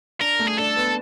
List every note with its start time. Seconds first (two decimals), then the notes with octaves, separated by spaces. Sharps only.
0.21 D4 A#4
0.39 A3
0.48 G#4
0.58 D4 A4
0.76 B3